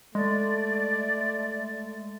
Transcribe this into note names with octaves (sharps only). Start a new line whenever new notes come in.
G#3 A3 D5